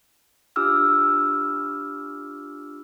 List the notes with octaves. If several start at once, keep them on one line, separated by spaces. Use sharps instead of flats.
D4 F4 G4 D6 E6 F6